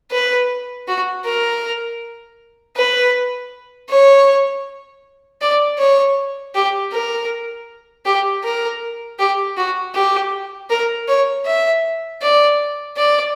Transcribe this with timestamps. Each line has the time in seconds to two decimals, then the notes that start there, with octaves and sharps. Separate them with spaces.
0.11 B4
0.87 F#4
1.25 A#4
2.76 B4
3.89 C#5
5.41 D5
5.78 C#5
6.54 G4
6.92 A#4
8.05 G4
8.44 A#4
9.19 G4
9.57 F#4
9.94 G4
10.70 A#4
11.08 C#5
11.46 E5
12.22 D5
12.97 D5